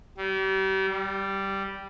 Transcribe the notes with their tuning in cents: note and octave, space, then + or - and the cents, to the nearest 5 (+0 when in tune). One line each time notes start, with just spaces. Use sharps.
G3 -35
G3 -5